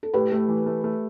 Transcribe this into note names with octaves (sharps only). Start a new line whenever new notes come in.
A4
A2 G4 B4
A3
E3
A3
A3